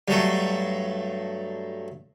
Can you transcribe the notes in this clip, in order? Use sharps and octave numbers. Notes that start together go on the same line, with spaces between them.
G2 F#3 A3